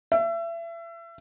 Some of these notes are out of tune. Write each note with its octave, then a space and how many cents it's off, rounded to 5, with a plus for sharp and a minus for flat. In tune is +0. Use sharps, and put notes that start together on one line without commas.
E5 +30